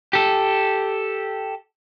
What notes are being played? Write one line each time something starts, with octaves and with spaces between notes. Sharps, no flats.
G4 A4